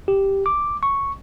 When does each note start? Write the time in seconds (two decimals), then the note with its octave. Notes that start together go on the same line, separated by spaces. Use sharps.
0.08 G4
0.46 D6
0.83 C#6